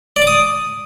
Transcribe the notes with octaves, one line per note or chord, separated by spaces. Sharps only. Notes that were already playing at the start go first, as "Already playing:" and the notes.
D5
D6
D#6